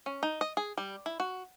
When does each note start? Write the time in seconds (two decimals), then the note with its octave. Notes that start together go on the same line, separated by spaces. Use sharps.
0.06 C#4
0.23 D#4
0.41 D#5
0.57 G#4
0.77 G3
1.06 E4
1.20 F#4